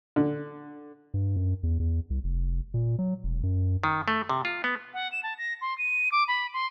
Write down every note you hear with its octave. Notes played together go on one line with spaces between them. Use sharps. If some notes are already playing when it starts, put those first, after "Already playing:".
D3
G2
F#2
E2
E2
C2
F1
A#2
F#3
E1
F#2
D#3
A3
C3
F4
B3
F#5
E7
A5
A#6
C6
D#7
D6
B5
C6